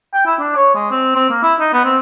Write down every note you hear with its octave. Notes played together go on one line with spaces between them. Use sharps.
G5
E4
D4
C#5
G#3
C4
C4
A#3
E4
D#4
B3
C4